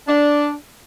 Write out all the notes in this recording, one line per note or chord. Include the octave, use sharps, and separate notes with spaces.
D4